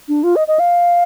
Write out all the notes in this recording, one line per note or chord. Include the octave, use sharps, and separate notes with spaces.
D4
F4
D#5
D#5
F5